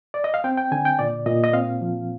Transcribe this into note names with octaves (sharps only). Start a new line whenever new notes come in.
D5
D#5
F5
C4 G5
G5
D3 G#5
G5
A#2 D5
A#2 D#5
D#5
C4 F5
F3